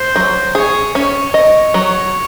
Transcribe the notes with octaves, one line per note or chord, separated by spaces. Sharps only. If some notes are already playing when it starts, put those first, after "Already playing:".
Already playing: C5
F#3
G#4 C#5
C#4 C#5
C#5 D#5
F#3